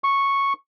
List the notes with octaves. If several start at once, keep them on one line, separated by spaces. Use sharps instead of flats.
C#6